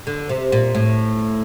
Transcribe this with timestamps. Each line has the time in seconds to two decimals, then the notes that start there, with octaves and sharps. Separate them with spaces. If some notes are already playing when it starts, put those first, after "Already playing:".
0.07 D3
0.29 C3
0.52 A#2
0.75 A2